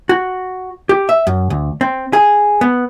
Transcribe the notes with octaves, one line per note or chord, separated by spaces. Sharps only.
F#4
G4
E5
F#2
D2
C4
G#4
B3